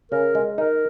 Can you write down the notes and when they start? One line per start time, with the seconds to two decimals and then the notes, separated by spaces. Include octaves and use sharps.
0.11 C#3 A#4
0.35 G#3
0.58 D#4 A#4